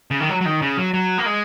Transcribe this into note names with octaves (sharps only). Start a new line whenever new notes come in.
C#3
D#3
F#3
F#3
D#3
C#3
F#3
F#3
A#3
G#3